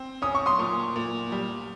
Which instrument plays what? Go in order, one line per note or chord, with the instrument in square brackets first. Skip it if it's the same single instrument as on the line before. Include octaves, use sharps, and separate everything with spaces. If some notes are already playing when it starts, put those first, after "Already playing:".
Already playing: [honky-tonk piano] C4
[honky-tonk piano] C#4 [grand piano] D#6
[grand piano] C#6
C6 D#6
[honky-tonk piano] A#2
A#2
G3